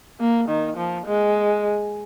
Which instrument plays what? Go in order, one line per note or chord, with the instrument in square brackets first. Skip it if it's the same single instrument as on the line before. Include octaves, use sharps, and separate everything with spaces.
[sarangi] A#3
D#3
F3
G#3